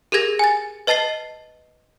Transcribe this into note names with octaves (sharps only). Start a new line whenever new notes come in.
G4 G#4 A#4 G#6 A#6
G#5 A6
B4 D#5 A5 A6 C7 G7